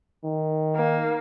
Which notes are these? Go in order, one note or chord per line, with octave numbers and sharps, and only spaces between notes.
D#3
A#3